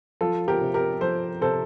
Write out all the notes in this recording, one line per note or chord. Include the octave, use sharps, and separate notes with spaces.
F3 F4 A4
G4 A#4
C3
G4 A#4
F3 A4 C5
C3 A4 C5